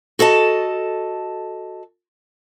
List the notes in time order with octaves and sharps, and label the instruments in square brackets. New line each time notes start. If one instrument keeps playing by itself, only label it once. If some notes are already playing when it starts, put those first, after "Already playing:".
[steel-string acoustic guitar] F#4 A4 D#5 A5